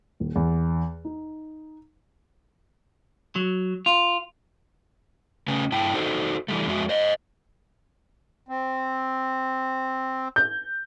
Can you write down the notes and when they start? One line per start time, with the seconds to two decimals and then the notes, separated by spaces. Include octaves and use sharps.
0.20 D#1
0.35 E2
1.05 D#4
3.36 F#3
3.86 F4
5.48 C#3 A3 C#4 B4 G#5
5.72 G2 E4 G5 A5
5.94 D#4 F#4 A4 C5
6.48 E3 G3 A3
6.67 F2 G#3 F#4 E5
6.89 C5 D#5
8.49 C4
10.36 G6